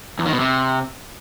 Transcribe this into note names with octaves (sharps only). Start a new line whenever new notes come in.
E2
D#3
B2
C3